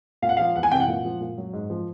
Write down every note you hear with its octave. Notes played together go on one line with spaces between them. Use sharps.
A#2 F5
F#5
F3 F5
E2 F#5
G#5
C3 E3 G5
F#5
A#2
F3
A#2
F#3
G#2
F3